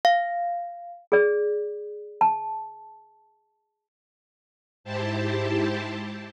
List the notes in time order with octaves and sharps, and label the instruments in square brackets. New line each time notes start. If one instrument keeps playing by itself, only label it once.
[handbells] F5
[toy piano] G#4 D5
A5
[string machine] G#2 E4 G4 C5 A5